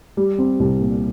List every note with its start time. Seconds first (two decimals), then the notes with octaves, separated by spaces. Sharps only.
0.17 G3
0.39 C4
0.60 C2
0.81 A#2